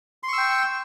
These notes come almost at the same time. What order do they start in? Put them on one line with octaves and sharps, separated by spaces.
C6 C#6 E6 G5